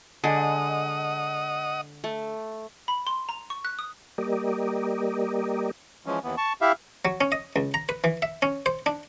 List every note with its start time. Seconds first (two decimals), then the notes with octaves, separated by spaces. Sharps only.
0.24 D3 G#3 D#5 F#5 D#6
2.04 A3
2.88 B5
3.07 C6
3.29 A#5
3.50 C#6
3.65 F#6
3.79 D#6
4.18 G3 A#3 G4 A#4 D5 D#5
6.06 E3 F3 G#3 C#4
6.23 D#2 E3 B3
6.38 A5 C#6
6.61 E4 G4 E5 F5
7.05 F#3
7.21 C#4
7.32 D#5
7.56 C#2
7.74 A#5
7.89 B4
8.04 E3
8.22 E5
8.42 C#4
8.66 C5
8.86 D4